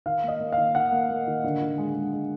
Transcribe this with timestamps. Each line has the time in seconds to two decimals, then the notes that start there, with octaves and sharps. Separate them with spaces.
0.06 D#3 F5
0.23 A#3
0.28 D#5
0.40 A#3
0.52 D#3 F5
0.75 D#3 F#5
0.92 A#3
1.10 A#3
1.27 D#3
1.44 D3
1.62 D3
1.78 G#3
1.95 G#3
2.13 G#3